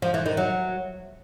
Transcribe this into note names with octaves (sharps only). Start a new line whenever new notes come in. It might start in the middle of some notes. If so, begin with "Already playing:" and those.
F3
E3
D#3
F#3